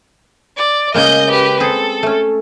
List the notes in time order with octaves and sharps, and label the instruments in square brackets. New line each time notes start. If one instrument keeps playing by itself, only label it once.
[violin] D5
[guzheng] C#3 G#3 A#3 [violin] D#5 G6
[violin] G4 B4
[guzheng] C4 G#4 [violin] A4
[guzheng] A3 C#4